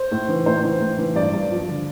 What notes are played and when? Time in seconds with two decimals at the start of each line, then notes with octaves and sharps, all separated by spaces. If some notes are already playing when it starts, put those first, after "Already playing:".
Already playing: C5
0.11 A2
0.29 E3
0.46 A2 C5
0.64 E3
0.81 A2
0.98 E3
1.15 G2 D5
1.33 G2
1.51 F3
1.68 D3